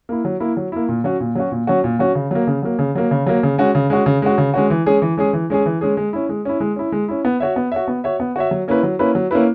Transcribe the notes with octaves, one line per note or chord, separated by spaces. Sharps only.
A#3 E4
F#3
A#3 E4
F#3
A#3 E4
A#2
F#3 C#4 F#4
A#2
F#3 C#4 F#4
A#2
F#3 C#4 F#4
A#2
F#3 C#4 F#4
C#3
F#3 A#3
C#3
F#3 A#3
C#3
F#3 A#3
C#3
F#3 A#3
C#3
G#3 C#4 F#4
C#3
G#3 C#4 F#4
C#3
G#3 C#4 F#4
C#3
G#3 C#4 F#4
E3
G#3 C#4 G#4
E3
G#3 C#4 G#4
E3
G#3 C#4 G#4
E3
G#3 C#4 G#4
G#3
C#4 E4
G#3
C#4 E4
G#3
C#4 E4
G#3
C#4 E4
B3
F#4 C#5 E5
B3
F#4 C#5 E5
B3
F#4 C#5 E5
B3
F#4 C#5 E5
F#3
A#3 C#4 E4 B4
F#3
A#3 C#4 E4 B4
F#3
A#3 C#4 E4 B4